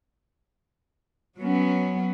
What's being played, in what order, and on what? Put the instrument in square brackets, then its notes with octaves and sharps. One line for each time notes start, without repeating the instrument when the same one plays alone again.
[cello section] F#3 B3 C#4